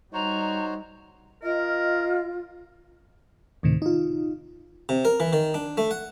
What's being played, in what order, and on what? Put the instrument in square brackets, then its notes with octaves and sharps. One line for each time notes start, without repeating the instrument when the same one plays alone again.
[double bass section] G3 [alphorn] D#4 [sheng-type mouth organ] F#4 C5 C#5 [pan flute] A#5
[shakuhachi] F4 [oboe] A#4 [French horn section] D#5
[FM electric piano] D2 A2 C3 D#3
D#4 F4
[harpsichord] C3
A#4
E3
D#3
D4
A3
F#5